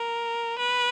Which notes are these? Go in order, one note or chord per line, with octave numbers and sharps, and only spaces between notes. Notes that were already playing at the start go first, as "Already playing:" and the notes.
Already playing: A#4
B4